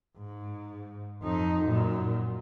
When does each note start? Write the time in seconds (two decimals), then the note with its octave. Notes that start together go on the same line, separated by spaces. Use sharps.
0.17 G#2
1.22 F2 D#4
1.64 F#2 A#2